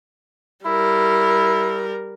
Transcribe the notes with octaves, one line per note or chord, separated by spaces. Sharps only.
G3 E4 A#4